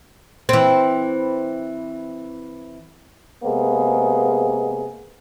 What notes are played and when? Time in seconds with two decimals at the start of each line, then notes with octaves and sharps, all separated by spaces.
0.49 E3 C4
3.44 C3 G#3 A#3 B3 G#4